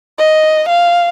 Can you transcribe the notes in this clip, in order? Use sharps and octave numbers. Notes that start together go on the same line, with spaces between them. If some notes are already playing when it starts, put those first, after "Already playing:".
D#5
F5